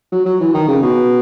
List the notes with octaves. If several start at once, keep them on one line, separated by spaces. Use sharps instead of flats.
F#3
F#3
E3
D#3
C#3
B2